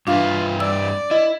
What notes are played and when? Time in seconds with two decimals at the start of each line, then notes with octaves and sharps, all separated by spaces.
0.07 G2 D4 E4 F4 B4 F5
0.60 D5 E6
1.11 E4 D#5